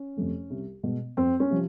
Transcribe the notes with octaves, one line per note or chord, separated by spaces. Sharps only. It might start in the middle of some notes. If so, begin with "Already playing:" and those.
Already playing: C#4
F2 C3 F3 A3
C2
B2 G#3
F2 C4
C#4
C3 F3